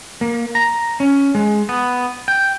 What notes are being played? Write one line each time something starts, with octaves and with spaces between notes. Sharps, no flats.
A#3
A#5
C#4
G#3
B3
G5